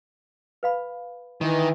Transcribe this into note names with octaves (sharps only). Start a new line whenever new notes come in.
B4 F5 B5
D#3 E3